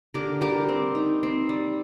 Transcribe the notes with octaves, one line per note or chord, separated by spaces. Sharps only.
D3 G4 A#4
G3 G4 A#4
C4
D#4
C4
G3